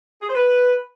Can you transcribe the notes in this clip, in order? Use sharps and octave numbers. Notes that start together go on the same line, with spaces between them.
G#4
C5
B4